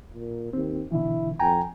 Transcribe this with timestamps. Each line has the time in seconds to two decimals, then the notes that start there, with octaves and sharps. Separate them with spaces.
0.13 A#2
0.53 D#2 C4
0.92 B2 D3 E3 E4
1.39 F2 G5 G#5 A#5